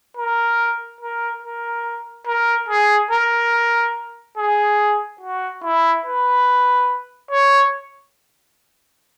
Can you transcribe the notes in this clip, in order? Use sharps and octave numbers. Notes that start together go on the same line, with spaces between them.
A#4
A#4
A#4
A#4
G#4
A#4
G#4
F#4
E4
B4
C#5